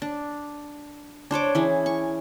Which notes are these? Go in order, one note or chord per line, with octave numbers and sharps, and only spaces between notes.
D4
D4 C5 C#5 D6
E3 C#4 G#4
C#6